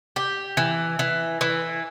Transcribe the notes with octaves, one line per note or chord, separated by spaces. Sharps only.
G4
E3
E3
E3